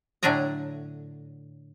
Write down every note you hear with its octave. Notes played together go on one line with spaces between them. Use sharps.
A2 D3 F#3 D4 G#5 A#5